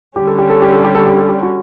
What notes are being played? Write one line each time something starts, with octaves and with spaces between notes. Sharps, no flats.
D3 G3 C#4 G4
A4
G4
A4
G4
A4
G4
A4
G4
A4
G4
F#4